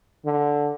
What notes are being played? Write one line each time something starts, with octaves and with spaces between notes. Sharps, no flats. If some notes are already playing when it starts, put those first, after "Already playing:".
D3